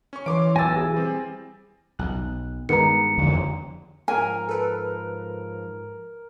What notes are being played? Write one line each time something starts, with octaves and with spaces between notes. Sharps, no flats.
C#4 C#6
E3 C#5 C6 D6 D7
B1 G#5 E6 A6 A#6
G#4
G3 C4
B1 F#6
G2 D#3 G#3 B3 A#5 C#7
F2 D3 E3
G#2 F3 A#4 G#5
A4 B4